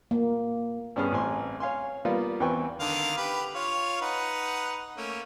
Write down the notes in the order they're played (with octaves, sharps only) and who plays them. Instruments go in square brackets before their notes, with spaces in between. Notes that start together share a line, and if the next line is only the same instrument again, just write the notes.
[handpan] A#3
[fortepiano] G2 B3 C#4 G#4 F6
A1 C4 G#5 C6
C#5 F5 G#5 C6
G3 A#3 B3 F4
E2 C4 B4 G5 G#5 C#6
[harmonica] D3 D#3 F5
G4 B4
F4 C#5 F5
D#4 B4 F#5
A3 A#3 C#4